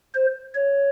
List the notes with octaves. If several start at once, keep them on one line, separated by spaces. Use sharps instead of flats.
C5
C#5